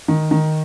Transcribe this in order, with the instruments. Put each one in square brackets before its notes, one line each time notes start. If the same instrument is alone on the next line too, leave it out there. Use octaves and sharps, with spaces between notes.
[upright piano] D#3
D#3